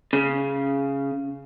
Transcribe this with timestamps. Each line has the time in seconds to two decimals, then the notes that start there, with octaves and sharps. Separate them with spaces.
0.13 C#3